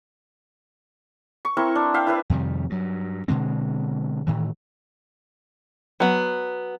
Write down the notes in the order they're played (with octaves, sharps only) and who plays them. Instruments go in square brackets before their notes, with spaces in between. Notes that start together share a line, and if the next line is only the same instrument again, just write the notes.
[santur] C#6
C4 E4 A#4 C#6
D4
E5 F5 G5
E4 B4 E5
[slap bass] F2 C3 D#3 G3
G2 F#3
B2 D3 G#3 C4
A2 D#3 E3
[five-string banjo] F#3 B3